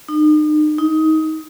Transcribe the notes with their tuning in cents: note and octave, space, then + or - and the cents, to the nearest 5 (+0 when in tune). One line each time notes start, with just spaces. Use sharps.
D#4 -40
D#4 +20